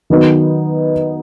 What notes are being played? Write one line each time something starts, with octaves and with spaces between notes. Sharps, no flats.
D#3 F#3 B3 D#4